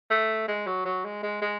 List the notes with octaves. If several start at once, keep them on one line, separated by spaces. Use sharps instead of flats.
A3
G#3
F#3
F#3
G#3
G#3
G#3